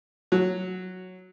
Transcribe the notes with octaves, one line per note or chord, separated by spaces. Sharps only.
F#3